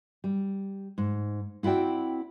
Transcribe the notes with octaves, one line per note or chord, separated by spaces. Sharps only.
G3
G#2
C4 E4 F#4 D5 G5